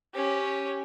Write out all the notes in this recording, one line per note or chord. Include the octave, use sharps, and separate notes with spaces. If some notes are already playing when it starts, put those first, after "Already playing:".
C#4 G4